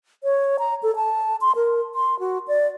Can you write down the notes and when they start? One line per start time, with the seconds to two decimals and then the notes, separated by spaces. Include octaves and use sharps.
0.24 C#5
0.59 A#5
0.83 A4
0.96 A5
1.41 C6
1.56 A#4
1.95 C6
2.20 F#4
2.48 D5